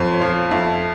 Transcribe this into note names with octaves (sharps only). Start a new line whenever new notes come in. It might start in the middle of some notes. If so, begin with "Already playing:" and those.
Already playing: F2 C5
C#5
F3 C5
F2 E5